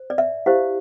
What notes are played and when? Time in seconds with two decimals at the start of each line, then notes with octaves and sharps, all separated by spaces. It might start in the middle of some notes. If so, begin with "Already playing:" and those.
Already playing: C5
0.10 D5
0.18 E5
0.46 E4 G4 C5 F5